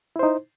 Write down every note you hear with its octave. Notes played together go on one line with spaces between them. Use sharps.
D#4 E4 C5